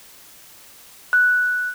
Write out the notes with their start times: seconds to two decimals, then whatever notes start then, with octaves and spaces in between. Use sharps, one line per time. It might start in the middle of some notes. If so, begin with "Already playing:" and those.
1.13 F#6